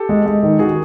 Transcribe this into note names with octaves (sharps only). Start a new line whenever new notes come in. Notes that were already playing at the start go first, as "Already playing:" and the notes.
Already playing: G4 A4
G#3
G#3
D#3
D#3 F#4 G#4